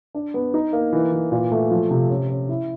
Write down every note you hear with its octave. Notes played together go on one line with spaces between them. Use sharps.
D4
B3
D#4
A#3
E3
E3
A#2
A3
F3
C3
C#4
C#4
E4